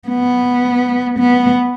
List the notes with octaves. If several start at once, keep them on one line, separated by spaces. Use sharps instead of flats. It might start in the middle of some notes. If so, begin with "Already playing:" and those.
B3
B3